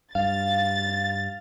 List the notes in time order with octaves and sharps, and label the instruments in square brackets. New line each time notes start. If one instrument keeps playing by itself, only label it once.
[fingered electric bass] G2 [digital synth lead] F5 [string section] A6